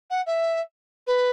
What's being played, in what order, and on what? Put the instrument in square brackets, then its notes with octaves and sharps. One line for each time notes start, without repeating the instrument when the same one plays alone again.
[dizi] F#5
E5
B4